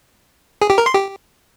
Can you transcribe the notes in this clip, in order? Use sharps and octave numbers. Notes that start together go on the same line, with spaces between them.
G#4
G4
A#4
C6
G4